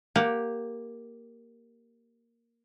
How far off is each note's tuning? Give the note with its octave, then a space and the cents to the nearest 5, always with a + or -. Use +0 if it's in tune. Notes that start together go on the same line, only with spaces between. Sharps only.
A#3 +0 G4 +0 F#5 +0